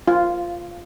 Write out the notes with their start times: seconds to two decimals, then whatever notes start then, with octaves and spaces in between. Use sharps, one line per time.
0.08 F4